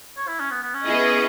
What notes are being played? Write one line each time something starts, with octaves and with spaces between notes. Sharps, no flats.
C#5
E4
C#4
B3
B3
C#4
B3 E4 G#4 D#5